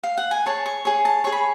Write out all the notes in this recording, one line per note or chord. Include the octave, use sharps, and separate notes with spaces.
F5
F#5
G#5
G#4 C#5 A5
C#6
G#4 C#5
A5
G#4 C#5 C#6
B5